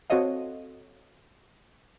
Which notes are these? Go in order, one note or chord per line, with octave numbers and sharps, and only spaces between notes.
C4 F#4 A4 C#5 D#5 F5